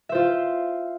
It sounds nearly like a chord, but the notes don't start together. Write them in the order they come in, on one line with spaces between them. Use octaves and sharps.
E5 C5 F4